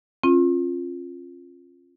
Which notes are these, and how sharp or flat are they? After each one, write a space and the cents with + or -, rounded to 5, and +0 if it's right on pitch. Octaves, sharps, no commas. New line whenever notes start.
C#4 -40 F4 +0